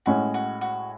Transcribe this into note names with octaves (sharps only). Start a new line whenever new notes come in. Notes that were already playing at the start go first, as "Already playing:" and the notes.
A2 G#3 C#4 F#4
F#4
F#4